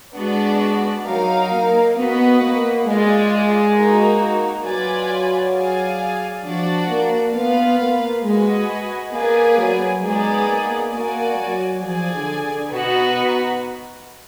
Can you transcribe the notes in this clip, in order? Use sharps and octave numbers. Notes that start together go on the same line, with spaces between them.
G#3 B3 D4 F#4 D5
F#3 D#4 A#4 F5
A#3
B3 F#4 B4 D#5 F#5
A#3
G#3 F4 G#4 D5
A#3 D#4 F#4
F#3 F4 B4 D5 G#5
G#4 D5 F5 G#5
F3 D4 F#4 D5
A#3
B3 F4 B4 F5
A#3
G#3 F#4 B4 D#5 G#5
A#3 G#4 B4 D5 G#5
F#3
G#3 B3 D#4 G#4 D5
A#3
A#3 F#4 D5 G#5
F#3
F3 G#4 D5 G#5
D3
D3
B2 B3 D#4 F#4 B4